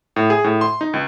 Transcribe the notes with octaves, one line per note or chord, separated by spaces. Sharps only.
A2
G#4
A2
C6
D#4
C#2